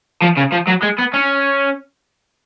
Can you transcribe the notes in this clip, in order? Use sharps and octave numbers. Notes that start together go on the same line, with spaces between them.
F3
C#3
F3
F#3
G#3
B3
C#4